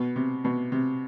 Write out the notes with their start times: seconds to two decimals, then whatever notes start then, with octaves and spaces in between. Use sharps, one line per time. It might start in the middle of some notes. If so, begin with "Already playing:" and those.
Already playing: B2
0.16 C3
0.44 B2
0.72 C3